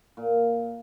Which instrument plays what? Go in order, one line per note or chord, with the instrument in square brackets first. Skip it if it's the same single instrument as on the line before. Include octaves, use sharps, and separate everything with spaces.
[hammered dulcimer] A#2